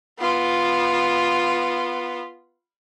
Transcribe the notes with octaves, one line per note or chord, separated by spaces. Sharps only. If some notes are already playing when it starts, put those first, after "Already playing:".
B3 F4